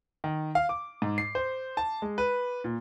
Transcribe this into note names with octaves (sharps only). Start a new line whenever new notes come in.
D#3
F5
D6
G#2
C7
C5
A5
G#3
B4
A#2